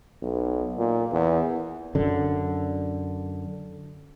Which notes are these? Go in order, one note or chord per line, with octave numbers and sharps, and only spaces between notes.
B1
A#2
E2
F#2 D3